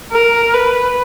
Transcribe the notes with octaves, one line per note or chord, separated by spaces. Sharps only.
A#4
B4